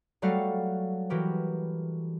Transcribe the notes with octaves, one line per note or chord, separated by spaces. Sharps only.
F#3 G3 A3 F#4 A4 F5
E3 F#4 G4 A#4